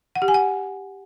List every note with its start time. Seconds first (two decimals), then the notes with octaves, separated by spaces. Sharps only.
0.15 F#5
0.22 G4
0.28 G#5
0.34 F#5